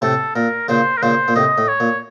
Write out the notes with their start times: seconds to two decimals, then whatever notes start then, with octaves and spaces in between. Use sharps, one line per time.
0.02 A2 C3 A4
0.36 A#2 A#4
0.68 A#2 C#3 C5
0.97 A#4
1.03 A#2 C#3 C5
1.28 A#2
1.35 A2 C3 D#5
1.58 A2
1.69 C#5
1.80 A#2